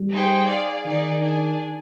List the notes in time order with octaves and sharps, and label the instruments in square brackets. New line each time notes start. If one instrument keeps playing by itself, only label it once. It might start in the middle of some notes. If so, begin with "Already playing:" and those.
Already playing: [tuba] G3
[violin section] D#4 G#4 C5 G5
G#4 D5 F5
[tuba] D#3 [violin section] D#4 G#4 D5
[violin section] D4 G#4 D5 G#5